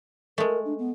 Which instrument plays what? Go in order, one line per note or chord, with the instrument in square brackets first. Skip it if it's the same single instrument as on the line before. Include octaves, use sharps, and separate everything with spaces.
[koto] G#3 A3 [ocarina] A#4
[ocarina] D4
B3